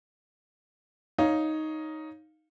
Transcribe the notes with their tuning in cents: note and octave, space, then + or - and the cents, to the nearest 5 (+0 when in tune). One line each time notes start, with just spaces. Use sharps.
D#4 +5 C#5 +5 F5 +0